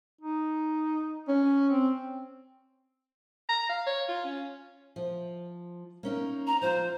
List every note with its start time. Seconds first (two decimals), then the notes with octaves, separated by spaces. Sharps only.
0.21 D#4
1.28 C#4
1.70 C4
3.49 A#5
3.69 F5
3.87 C#5
4.09 F4
4.24 C#4
4.96 F3
6.03 A#3 C#4 D#4
6.47 A#5
6.61 F3 F4 C5